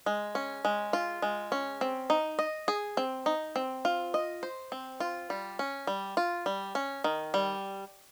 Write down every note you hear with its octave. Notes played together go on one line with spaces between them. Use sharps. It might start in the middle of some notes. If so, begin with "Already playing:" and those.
G#3
C#4
G#3
F4
G#3
C#4
C4
D#4
D#5
G#4
C4
D#4
C4
F4
D#5
C5
C4
F4
G3
C#4
G3
F4
G3
C#4
D#3
G3